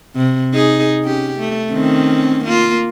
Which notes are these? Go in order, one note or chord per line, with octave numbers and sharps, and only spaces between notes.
C3
D#4 G#4
C#4 G4
A3
D#3 C4 C#4
A#3 F4